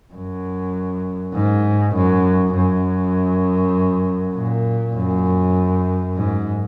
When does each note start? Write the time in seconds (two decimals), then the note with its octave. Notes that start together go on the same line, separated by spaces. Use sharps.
0.14 F#2
1.34 G#2
1.95 F#2
2.55 F#2
4.35 A#2
4.95 F#2
6.16 G#2